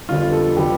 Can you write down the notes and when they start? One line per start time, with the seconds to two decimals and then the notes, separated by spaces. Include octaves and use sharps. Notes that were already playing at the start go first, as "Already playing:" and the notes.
0.09 F2 D3 G3 B3 F4
0.32 A4
0.56 D3 G3 B3 G4